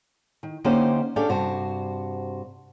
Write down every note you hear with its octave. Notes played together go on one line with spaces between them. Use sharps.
D#3
D3 A#3 C#4 D#4 G4 C5
C#4 D4 G4 A4 D5 F5
G2 C3 F#4 C5 A5